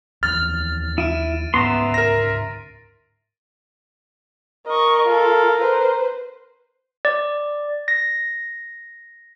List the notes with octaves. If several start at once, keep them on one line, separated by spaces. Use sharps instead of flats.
D#2 E3 F3 F6 A6
E4 D7 D#7
D2 G#2 B3 C#4 E5 A#5 C6
A#4 A#6
A#4 D#5 C#6
F4 A4
B4 C5
D5
A#6